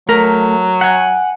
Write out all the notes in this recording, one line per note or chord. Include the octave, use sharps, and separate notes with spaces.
F#3 A3 A#4
F#5 G#5